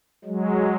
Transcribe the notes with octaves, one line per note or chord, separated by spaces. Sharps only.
F#3 G#3